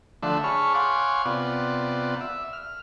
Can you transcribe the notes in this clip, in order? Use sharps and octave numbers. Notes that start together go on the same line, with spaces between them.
D3 F3 A3 D4 E5 F#5
G#4 C#5 A5 B5 C#6 F6
C#5 F5 F#5 G#5 C6 D6
C3 B3 F4 D5 F#5
E5
F6